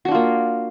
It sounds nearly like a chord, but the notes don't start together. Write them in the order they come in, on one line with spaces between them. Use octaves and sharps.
F#4 D4 F4 A#3